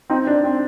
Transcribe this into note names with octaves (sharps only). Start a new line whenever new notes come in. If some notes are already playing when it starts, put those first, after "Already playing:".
C4 D#4
D4
C4